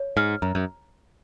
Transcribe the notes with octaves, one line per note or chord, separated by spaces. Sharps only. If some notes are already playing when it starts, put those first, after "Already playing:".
Already playing: C#5
G#2 F6
F#2 A#5
F#2